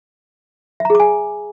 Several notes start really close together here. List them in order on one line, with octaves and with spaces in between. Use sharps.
E5 A#5 G#4 D6 G#5